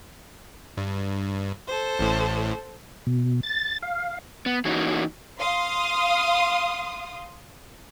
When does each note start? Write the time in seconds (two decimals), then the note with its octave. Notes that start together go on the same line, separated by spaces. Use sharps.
0.77 G2
1.67 A4 C5
1.99 A1 A2
3.07 B2
3.43 A6
3.82 F5
4.46 B3
4.65 E3 A#3 C#4 D#4 F#4
5.39 F5 C6 D#6